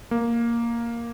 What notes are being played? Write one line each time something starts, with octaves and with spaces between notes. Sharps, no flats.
A#3